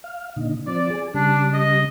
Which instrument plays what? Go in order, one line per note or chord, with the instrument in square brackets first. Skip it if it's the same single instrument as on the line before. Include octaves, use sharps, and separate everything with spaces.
[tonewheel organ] F5
A#2 D3 D#4
[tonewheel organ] F3 C4 [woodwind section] D5
[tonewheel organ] G#4
[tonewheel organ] C#3 G3 [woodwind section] D4
[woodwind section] D#5